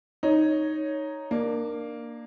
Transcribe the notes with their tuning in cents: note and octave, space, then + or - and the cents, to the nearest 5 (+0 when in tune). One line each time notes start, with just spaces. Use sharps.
D#4 +0 C#5 +0
A#3 +0 D4 +25